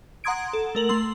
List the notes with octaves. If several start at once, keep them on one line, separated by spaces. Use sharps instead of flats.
F#5 A#5 C6 D#6 G#6 D7
A4
A3 A#4 F#7
A3 C6 E6